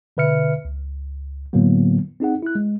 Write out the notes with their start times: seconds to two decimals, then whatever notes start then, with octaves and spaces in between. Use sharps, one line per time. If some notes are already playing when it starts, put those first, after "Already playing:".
0.17 B2 D3 B4 E5 F6 C#7
0.65 C#2
1.53 A2 D3 F#3 A#3 B3
2.20 C4 D#4 G#4 F#5
2.43 E4 F#6
2.55 G#3